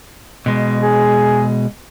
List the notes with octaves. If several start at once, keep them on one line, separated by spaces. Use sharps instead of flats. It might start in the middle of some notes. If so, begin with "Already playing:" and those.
B2 G#3
G#4